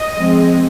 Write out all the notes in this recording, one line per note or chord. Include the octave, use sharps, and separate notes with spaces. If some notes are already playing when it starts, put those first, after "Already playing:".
Already playing: D#5
F3 G#3 C4